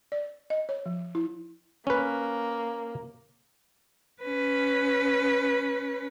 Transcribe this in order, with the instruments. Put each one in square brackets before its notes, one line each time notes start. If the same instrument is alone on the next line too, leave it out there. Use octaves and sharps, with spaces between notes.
[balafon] D5
D#5
C#5
F3
E4
[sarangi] A#3 [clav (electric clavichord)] C#4 B4
[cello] C#4 B4